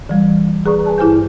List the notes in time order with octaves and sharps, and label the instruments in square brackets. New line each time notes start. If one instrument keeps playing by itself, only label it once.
[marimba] E3 G3
G#4 B4 D5 A#5 C#6 D#6
B4 G#5 A5
G2 E4 G4 C5 G#5 G6